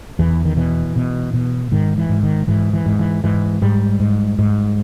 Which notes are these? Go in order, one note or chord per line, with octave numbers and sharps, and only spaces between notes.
E2 E3
D#3
B2 E3
B2
B2
G#2 D#3
E3
G#2
D#3
G#2 E3
E3
G#2
E3
G#2 E3
G#2 G3
G#2
G#2